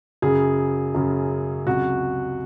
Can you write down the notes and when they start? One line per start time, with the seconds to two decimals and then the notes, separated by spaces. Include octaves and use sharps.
0.22 F#2 C#3 F#3 G#4
0.95 F#2 C#3 F#3
1.67 C#2 C3 F#3 F#4